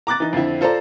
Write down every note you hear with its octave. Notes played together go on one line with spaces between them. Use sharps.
A#5 D6 F#6 A6
E3 D#4
F2 D3 C4 E4
F4 A4 C5 D5 A#5